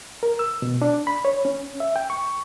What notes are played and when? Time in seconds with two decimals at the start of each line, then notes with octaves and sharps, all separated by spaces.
0.23 A#4
0.39 E6
0.62 B2
0.82 D4
1.07 B5
1.25 C#5
1.45 C#4
1.80 E5
1.96 G5
2.10 C#6